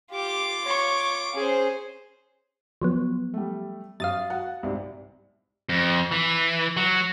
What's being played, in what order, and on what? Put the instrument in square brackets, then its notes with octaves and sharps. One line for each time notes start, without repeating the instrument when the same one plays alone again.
[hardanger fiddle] F4 D6 [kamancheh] G4
[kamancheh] C#5 C#6
[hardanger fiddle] C#4 C5 [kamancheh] G#4
[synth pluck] F3 F#3 B3
[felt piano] G3 A3
[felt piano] F#2 [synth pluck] F5 D#6 A6
[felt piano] F#4 F#5
C2 G#2 D5
[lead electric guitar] F2
E3
F#3